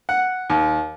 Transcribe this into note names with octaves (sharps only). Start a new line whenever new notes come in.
F#5
D#2